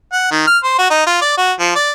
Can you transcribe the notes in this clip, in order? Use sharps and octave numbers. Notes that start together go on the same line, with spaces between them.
F#5
D#3
F6
C5
F#4
D#4
F4
D5
F#4
F3
D5